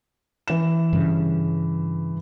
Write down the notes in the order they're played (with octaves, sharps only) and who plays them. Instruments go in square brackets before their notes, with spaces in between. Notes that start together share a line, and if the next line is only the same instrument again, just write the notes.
[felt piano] E3 E7
[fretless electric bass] G2 C#3